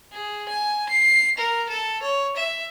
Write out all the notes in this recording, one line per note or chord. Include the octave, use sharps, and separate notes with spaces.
G#4
G#5
C7
A#4
A4
C#5
E5